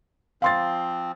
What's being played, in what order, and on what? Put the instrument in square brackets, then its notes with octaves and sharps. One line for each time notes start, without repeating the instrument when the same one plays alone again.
[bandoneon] F3 C4 [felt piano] F5 C6 A6